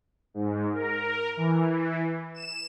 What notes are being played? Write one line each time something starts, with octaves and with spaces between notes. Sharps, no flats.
G#2
A#4
E3
E7